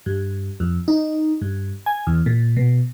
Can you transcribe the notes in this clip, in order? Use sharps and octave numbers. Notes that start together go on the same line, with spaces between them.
G2
F2
D#4
G2
G#5
E2
A#2
B2